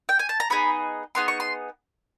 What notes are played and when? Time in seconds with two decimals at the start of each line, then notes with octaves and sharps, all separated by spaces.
0.09 G5
0.19 G#5
0.29 A5
0.40 A#5
0.50 B3 D#4 G#4 B5
1.15 B3 D#4 G#4 C6
1.28 C#6
1.40 C6